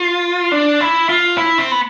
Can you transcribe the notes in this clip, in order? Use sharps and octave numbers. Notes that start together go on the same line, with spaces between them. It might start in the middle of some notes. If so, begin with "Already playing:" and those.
Already playing: F4
D4
E4
F4
E4
C4
B3